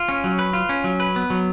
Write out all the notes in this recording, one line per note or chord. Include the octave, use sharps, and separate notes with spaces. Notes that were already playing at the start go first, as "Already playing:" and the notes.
Already playing: F4
C#4
F#3
B4
F4
C#4
F#3
B4
B3
F#3